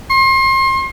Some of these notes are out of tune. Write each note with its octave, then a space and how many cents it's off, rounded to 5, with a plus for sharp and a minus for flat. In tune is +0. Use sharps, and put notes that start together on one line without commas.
C6 +35